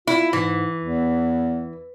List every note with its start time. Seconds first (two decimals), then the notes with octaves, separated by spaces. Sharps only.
0.07 E4 F4
0.33 G#2 E3
0.84 E2